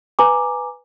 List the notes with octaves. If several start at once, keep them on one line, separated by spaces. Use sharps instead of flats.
B4 G#5 A#5 D6